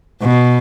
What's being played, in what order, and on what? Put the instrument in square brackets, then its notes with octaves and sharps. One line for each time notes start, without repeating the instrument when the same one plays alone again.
[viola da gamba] B2